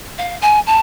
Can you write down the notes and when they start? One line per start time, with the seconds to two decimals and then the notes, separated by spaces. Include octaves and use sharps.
0.18 F5
0.41 G#5
0.66 A5